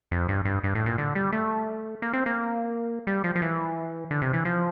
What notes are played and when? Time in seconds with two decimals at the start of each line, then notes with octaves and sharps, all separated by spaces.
0.11 F2
0.28 G2
0.45 G2
0.64 G2
0.75 A2
0.86 A#2
0.98 D3
1.15 G3
1.32 A3
2.02 A#3
2.13 C4
2.26 A#3
3.07 G3
3.24 F3
3.36 F3
3.42 E3
4.11 D3
4.22 C3
4.33 E3
4.45 F3